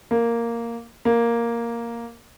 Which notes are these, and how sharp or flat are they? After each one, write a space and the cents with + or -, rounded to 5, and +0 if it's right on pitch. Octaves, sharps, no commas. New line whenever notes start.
A#3 -5
A#3 +0